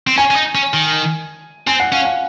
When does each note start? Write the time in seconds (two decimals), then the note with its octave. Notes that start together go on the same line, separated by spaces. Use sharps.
0.07 C4
0.17 C#4 G#5
0.31 C#4
0.36 D#4
0.55 C#4
0.74 D#3
1.67 C4 G#5
1.80 F#5
1.92 C#4 F5
2.05 F#5